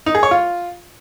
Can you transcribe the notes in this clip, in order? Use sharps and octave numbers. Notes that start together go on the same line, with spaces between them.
D#4
G#4
C#5
F4